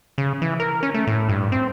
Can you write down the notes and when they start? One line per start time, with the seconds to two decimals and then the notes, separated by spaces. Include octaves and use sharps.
0.18 C#3
0.42 E3
0.60 A#4
0.83 C#4
0.94 A3
1.07 A2
1.29 G2
1.52 C4